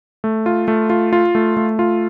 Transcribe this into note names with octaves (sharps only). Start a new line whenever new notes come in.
A3
F4
A3
F4
F4
A3
A3
F4